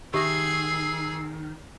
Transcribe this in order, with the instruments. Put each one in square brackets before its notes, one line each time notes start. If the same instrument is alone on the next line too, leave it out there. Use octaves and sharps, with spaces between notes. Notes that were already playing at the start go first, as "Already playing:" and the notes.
[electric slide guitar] D#3 [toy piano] G4 E5 D#6 [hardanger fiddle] G#4 [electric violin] E6 C7